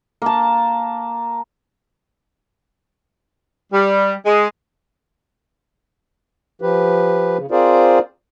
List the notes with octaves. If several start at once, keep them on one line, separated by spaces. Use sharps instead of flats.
A#3 A5
G3
G#3
F3 G4 B4
C#3
C4 F4 G#4 A#4 C5 D5